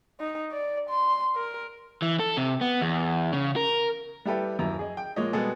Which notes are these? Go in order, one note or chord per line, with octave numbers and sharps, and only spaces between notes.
D#4
D5
C6
A#4
E3
A4
C3
B3
E2
C#3
A#4
G3 E4 G4 A4 B4 E5
D#1 F#2 E4 A#5
G#4 D#5
G5
A#2 F3 G#3 A#3 C#5 D#5
B2 G3 G#3 B3 G#4 A4